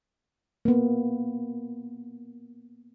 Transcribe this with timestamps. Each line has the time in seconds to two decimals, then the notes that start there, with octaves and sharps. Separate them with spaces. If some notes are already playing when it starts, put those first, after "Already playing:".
0.65 A#3 B3